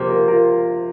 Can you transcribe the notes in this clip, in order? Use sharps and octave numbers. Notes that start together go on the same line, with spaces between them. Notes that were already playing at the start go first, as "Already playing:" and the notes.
Already playing: C3 F3 A#3 G4 C5
F4 A#4
F4 A#4